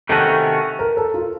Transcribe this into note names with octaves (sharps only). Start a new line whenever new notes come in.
C3 D#3 A3 C#4 F#4 A4
A#4
A4
F4